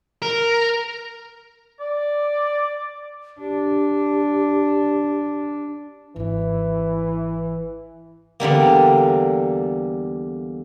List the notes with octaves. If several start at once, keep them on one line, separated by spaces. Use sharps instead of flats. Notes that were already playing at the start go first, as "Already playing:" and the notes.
A#4
D5
D4 G4
G#1 E3 E4
E2 D3 G3 A#3